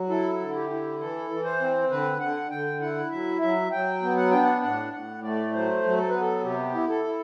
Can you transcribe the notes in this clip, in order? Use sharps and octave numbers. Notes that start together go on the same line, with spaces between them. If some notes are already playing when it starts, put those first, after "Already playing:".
Already playing: F#3
E4 A4
D3
G4
E4
E3 A4
E3
C5
C4
D3 B4
D3 F#5
D3 G5
E4 F#5
F#3 E5
F#3 E5
F#3 G5
B3
F#5
D4 G5
F#5
A2 F#5
A2 F#5
A3 D5
F#3 C5
F#3
A4
B3 B4
A4
C3 G4
E4
A4
E4